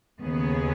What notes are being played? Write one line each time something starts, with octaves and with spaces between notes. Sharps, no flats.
D#2 C#3 B3 G#4